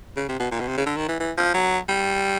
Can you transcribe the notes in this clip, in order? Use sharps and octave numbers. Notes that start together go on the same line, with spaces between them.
C#3
C3
B2
A#2
B2
C3
C#3
D3
D#3
E3
E3
F3
F#3
G3